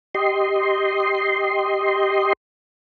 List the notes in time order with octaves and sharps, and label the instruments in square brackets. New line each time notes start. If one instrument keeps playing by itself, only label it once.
[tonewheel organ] G4 D#5 C6